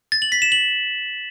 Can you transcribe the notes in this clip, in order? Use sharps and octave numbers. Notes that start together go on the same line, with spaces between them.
A6
F#7
B6
E7
F#7